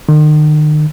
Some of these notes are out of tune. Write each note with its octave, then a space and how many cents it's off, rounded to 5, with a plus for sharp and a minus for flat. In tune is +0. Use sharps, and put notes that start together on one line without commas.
D#3 -40